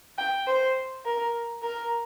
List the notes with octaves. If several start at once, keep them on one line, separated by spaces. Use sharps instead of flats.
G5
C5
A#4
A#4